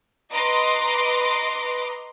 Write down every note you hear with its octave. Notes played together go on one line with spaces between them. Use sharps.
B4 D#5 A#5 C6 D6